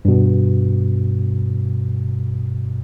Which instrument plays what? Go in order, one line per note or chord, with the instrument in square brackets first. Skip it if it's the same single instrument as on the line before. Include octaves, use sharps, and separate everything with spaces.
[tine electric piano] G2 B2